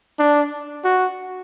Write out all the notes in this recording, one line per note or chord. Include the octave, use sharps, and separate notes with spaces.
D4
F#4